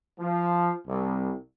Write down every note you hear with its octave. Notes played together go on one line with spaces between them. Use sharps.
F3
C2